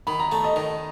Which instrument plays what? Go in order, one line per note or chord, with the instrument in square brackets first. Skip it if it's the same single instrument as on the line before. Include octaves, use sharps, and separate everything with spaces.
[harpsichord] D#3 [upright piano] B5
[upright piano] A#5
[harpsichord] A3 [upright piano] A5
[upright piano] D#5
[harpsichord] D#3 [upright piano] D#5